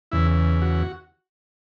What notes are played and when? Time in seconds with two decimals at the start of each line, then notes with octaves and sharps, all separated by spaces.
0.12 E2 C#3 E3 E4
0.62 F#4